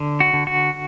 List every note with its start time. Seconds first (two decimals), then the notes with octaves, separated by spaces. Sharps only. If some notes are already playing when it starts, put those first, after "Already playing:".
Already playing: D3
0.20 F#4
0.33 D3
0.47 F#4